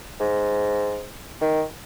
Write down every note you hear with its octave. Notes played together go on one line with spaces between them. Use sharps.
G#2
D#3